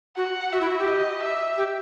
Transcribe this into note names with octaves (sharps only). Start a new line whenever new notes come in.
F#4 F#5
F#4 E5
E4
F#4
G4
D#5
E5
G4